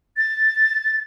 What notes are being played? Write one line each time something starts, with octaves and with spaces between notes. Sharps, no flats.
A6